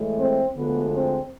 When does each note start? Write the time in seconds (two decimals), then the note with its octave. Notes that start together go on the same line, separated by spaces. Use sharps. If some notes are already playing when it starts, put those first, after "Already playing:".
Already playing: A2 E3 G#3
0.17 C4
0.56 D2 D3 F3 G#3 B3
0.93 C4